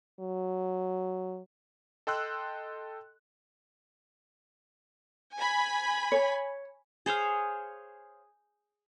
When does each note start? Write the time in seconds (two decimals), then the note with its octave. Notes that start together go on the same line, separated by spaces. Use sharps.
0.20 F#3
2.07 A4 D#5 G5 C6 E6 F#6
5.38 G#5 B5
6.12 C#5
7.06 G#4 C5 C#5 F5